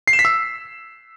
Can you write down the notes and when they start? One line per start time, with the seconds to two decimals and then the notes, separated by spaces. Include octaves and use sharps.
0.08 C7
0.13 E7
0.19 B6
0.25 E6